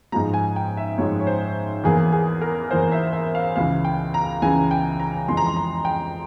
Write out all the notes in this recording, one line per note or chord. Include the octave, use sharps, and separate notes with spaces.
G#2 F3 G#3 A#5
G#5
G5
E5
G#2 F3 G#3 C#5
C#5
C5
E2 E3 A#3 G#4
G#4
A#4
E2 E3 A#3 C5
E5
E5
F5
C#2 C#3 E3 F5
G5
A#5
C#2 C#3 E3 G#5
G5
A#5
F2 E3 G#3 C6
A#5
C6
A#5
G5